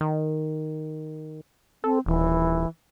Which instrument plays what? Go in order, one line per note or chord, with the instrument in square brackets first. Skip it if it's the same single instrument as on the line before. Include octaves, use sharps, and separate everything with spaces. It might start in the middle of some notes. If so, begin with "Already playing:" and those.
[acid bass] D#3
[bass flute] C4 [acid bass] A4
[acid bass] D#1 [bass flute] E3